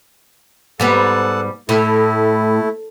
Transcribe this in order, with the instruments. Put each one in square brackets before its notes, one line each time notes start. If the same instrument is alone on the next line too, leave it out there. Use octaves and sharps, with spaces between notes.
[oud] G#2 G3 B3 [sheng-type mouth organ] A4 F#5 A5
[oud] A2 [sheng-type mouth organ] A3 E4